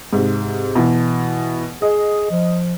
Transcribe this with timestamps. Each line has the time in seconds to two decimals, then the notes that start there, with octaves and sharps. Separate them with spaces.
0.13 G#2 C3
0.75 B2 E3
1.82 G#4 D#5
2.31 F3